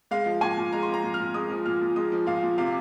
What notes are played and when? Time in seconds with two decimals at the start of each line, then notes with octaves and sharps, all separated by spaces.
0.11 G#3 F5
0.26 F3
0.41 A#2 G#5
0.57 A#2
0.73 G#3 A#5
0.83 C6
0.88 F3
0.94 A#5
1.03 A#2
1.14 F6
1.19 A#2
1.34 G#3 D#6
1.50 F3
1.66 A#2 F6
1.81 A#2
1.96 G#3 D#6
2.12 F3
2.26 A#2 F5
2.43 A#2
2.58 C3 F5